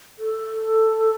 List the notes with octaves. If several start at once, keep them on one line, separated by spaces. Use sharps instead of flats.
A4